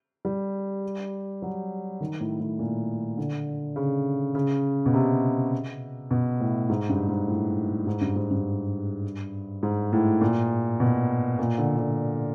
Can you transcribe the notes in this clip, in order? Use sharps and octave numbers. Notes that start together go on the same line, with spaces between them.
G3
F#3
D#3
A2
A2
A#2
D3
C#3
C#3
B2
C3
B2
A2
G#2
G2
G#2
A2
G#2
G2
G#2
G2
G#2
A2
A#2
B2
A#2
D3
D3